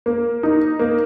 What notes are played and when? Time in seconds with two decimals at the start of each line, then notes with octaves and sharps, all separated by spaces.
0.06 A#3
0.43 D#4
0.79 A#3